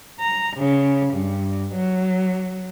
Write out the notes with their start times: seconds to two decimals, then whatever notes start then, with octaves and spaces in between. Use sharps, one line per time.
0.20 A#5
0.56 C#3
1.13 G2
1.75 F#3